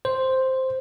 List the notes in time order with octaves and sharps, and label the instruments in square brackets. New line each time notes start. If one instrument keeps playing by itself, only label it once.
[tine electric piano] C5